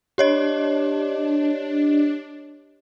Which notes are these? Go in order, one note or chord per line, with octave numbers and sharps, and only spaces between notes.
D4 G4 C#5 D#5